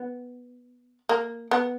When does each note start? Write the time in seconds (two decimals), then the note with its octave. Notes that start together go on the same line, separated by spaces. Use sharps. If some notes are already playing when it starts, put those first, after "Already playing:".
Already playing: B3
1.09 A#3
1.51 B3